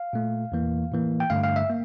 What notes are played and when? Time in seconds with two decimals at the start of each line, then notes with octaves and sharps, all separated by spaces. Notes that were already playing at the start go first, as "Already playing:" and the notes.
Already playing: F5
0.13 A#2 A3
0.52 E2 E3 A#3
0.92 A2 E3 A#3
1.20 G5
1.30 G2 D3 A3 F5
1.44 F5
1.56 E5
1.70 A#3